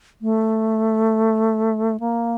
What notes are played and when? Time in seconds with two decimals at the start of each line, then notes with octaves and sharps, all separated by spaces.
0.21 A3
2.00 A#3